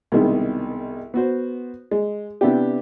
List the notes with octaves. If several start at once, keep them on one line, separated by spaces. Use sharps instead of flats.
C2 B2 D#3 G#3
B3 F#4 C5
G#3
C3 B3 D4 E4 G4